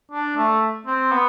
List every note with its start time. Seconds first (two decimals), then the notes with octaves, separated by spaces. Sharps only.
0.11 D4
0.37 A3
0.87 C4
1.12 B3